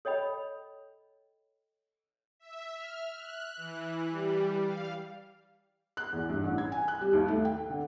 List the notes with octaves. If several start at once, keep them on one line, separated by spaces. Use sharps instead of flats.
A4 C#5 D#5 G5 B5
E5
F6
F#6
E3
G3
F5
F#6
E2
G2
A1
G#6
G#5
F#6
G3
D#2
A3
G5
D3